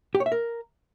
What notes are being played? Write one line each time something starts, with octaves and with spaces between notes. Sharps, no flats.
G4
C#5
E5
A#4